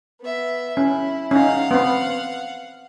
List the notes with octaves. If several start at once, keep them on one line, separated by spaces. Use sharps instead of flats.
B3 E5
C#4 E4
C#4 D#4 F5 F#5
B3 C4